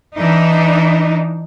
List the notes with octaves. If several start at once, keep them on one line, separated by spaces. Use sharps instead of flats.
E3 D4 D#4